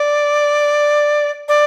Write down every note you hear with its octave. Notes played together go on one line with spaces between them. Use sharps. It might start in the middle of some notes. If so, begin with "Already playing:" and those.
Already playing: D5
D5